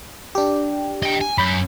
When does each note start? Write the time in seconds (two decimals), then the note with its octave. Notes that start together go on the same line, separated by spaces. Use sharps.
0.35 D4 G4
1.03 D#5 G5
1.21 G#5
1.38 F#2 B5 G6